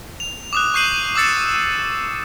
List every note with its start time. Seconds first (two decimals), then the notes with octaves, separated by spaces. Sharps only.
0.20 F7
0.53 D6 D#6 F#6
0.74 C#6 G6 C7 D#7 F#7
1.16 D6 E6 A6 C#7 E7